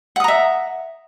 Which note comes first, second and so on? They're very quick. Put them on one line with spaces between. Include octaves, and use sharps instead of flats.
F#5 D#6 A#5 E5